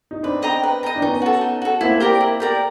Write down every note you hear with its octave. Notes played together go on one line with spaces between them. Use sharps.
D#4
C4 D4 B4
D#5 G5 A#5
B4
D#5 G5 A#5
D4
B3 C#4 D#4
F#4 A4
D#4
F#4 A4
A#3 C4 E4
G4 A#4 D5
E4
G4 A#4 D5